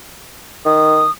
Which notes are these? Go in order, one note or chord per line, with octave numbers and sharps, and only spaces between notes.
D#3 D#6